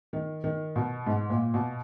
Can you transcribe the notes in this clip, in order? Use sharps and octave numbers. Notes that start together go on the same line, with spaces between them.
D#3
D#3
B2
G#2
A#2
B2